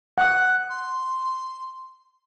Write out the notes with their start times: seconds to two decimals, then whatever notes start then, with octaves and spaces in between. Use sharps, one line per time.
0.18 F#5 D#6 F#6
0.69 C6